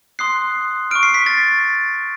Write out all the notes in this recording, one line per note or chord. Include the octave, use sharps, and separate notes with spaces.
C6 D#6 F#6 C7
C#6 F6 D7
C7
B6
A6